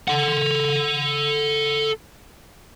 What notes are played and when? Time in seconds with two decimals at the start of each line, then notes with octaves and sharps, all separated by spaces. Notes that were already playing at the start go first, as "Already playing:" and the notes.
0.08 A4 F#5